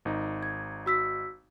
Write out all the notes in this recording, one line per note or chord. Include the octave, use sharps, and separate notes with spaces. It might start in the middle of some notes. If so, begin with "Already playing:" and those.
G#1 D#4
G#6
F#4 E6 B6